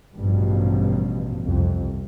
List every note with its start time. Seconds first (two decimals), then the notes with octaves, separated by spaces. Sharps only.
0.16 A1 G2 B2 F3
1.43 C2 F2